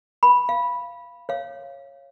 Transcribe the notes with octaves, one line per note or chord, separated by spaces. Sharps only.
B5
F5
C#5 F5